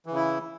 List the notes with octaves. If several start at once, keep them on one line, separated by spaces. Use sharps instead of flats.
C#3 E3 E4